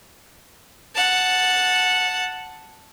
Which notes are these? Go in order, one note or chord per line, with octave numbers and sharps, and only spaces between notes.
F#5 A5